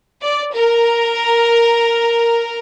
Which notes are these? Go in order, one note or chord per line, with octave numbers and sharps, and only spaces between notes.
D5
A#4